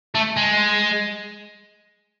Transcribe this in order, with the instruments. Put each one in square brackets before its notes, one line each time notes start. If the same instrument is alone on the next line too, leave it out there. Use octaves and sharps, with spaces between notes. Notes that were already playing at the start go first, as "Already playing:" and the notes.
[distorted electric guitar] A3
G#3